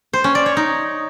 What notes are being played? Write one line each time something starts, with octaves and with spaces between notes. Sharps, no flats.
C5
C#4
D5
C#5
D#4